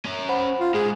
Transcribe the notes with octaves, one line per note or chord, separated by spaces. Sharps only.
C#4 A#5
C5 F#5 B5
F4
G#2 G#4